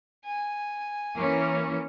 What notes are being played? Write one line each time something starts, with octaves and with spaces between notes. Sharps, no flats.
G#5
E3 A#3 C#4